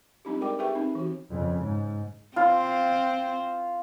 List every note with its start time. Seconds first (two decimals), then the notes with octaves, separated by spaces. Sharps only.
0.25 G3 C4 D4 D#4 F4 G4
0.40 G#3 G#4 A#4 D5 G5 D6
0.59 G4 G#4 B4 E5 G5 C#6
0.75 C4 D#4
0.95 E3 F#4
1.30 F2 C#3
1.62 G#2
2.36 C4 F4